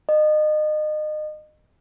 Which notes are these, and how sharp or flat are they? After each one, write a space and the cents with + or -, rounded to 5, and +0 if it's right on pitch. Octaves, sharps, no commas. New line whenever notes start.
D#5 -30